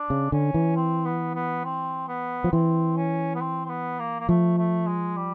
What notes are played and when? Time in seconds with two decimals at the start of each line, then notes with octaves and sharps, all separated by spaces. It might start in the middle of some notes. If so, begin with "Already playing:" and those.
Already playing: D4
0.10 C#3
0.32 D3 C#4
0.54 E3
0.76 C4
1.06 B3
1.35 B3
1.64 C4
2.09 B3
2.44 F3
2.52 E3 C4
2.97 C#4
3.35 B3
3.41 C4
3.66 C4
3.70 B3
3.99 A#3
4.20 A#3
4.29 F3 A3
4.58 A3
4.87 G#3
5.17 G3